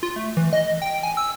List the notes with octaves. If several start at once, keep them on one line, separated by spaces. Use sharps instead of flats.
F4
A3
E3
D#5
G5
G#5
E6